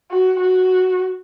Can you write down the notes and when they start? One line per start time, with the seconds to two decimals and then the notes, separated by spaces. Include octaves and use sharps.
0.11 F#4
0.40 F#4